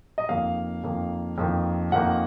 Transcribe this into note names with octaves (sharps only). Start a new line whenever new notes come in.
D#5
F2 D#3 A#3 F5
F2 D#3 A#3
F2 D#3 A#3
F2 D#3 A#3 F#5